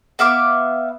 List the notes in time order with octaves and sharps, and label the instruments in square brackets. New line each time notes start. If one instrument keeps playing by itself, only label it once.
[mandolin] B3 E5 F5 D6